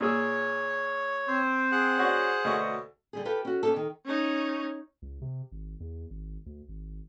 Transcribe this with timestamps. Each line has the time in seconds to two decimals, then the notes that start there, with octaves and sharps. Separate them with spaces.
0.01 A#2 G#4 C#5 E6
1.28 C4 C5
1.72 G#4 F#5 F#6
1.97 C#4 F#4 D5
2.44 D2 B2 F#4 C#5 D#5
3.13 D3 G3 G#4
3.25 F4 G4 A4 B4
3.45 C#4 F#4
3.63 B3 C#4 D#4 G4 A4
3.76 D#3
4.05 C#4 D#4
5.02 C#2
5.22 C3
5.52 G#1
5.80 E2
6.10 G#1
6.46 D2
6.69 G#1